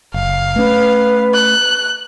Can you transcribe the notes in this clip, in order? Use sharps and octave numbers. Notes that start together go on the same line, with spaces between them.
F#1 F5
A3 C#4 B4
F#6